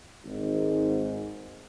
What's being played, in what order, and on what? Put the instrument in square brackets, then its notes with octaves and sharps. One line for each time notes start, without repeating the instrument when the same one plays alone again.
[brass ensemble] G#1 G#2